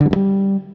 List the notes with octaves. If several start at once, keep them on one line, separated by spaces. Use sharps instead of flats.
D3
G3
G2
G3